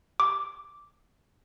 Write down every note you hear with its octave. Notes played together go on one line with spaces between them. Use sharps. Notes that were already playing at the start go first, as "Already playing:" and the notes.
D6